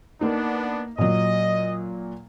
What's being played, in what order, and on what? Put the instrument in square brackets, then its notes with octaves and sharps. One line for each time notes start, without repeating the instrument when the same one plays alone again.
[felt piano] A#3 D#4 [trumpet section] B3 D4
[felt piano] A#2 F#3 [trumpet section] D#5